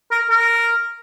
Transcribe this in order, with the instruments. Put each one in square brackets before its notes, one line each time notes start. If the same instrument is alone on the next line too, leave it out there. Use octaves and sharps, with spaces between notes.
[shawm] A#4
A#4